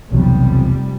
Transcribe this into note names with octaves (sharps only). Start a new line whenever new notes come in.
F1 B1 E2 F#3 G3